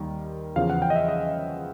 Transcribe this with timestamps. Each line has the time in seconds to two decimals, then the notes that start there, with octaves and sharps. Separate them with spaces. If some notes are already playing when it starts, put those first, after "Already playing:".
Already playing: D#2 D#3 G3
0.56 E2 C#3 F3 F5
0.70 F#5
0.82 G5
0.90 D#5
0.96 E5
1.09 D#5